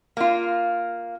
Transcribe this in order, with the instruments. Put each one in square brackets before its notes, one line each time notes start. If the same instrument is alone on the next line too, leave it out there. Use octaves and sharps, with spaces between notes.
[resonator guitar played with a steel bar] A#3 F4